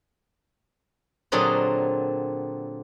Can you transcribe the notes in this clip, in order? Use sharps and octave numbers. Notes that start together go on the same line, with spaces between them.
A#2 D3 F#3 C4 G#4 D#5